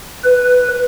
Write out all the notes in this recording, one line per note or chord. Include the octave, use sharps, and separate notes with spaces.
B4